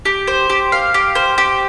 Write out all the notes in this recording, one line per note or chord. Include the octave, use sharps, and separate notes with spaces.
G4
C5
G4
F5
G4
C5
G4